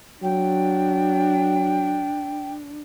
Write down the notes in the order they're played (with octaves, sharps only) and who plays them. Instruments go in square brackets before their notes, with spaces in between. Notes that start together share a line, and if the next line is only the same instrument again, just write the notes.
[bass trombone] F#3 [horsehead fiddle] D4 [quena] G5